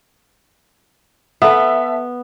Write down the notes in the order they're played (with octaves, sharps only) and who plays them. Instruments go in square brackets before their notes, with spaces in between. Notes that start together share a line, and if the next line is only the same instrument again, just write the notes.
[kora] B3 [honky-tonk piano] A4 E5